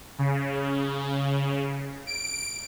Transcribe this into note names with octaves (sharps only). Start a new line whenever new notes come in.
C#3
D7